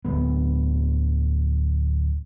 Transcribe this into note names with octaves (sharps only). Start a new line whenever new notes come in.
D1 D2 B3